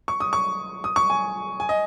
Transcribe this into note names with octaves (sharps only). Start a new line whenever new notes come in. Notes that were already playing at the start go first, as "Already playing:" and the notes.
C#6
D#6
C#6
D#6
C#6
G#5
G#5
D#5